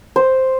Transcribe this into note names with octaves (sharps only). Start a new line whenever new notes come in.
C5